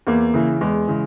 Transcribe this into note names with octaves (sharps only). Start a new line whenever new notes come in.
E2 A#3
C#3 E3
E2 G#3
C#3 E3